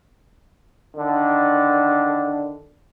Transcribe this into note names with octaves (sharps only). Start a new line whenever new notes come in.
D3 D#3 D4